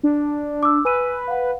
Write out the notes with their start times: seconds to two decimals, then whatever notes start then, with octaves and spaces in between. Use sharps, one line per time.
0.03 D4
0.63 D6 E6
0.85 B4 G#5 E6 D#7
1.28 F5 F#5